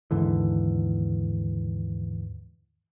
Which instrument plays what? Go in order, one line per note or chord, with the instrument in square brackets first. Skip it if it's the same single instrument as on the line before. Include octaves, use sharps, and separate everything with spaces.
[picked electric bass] D#2 G#2 D3 E3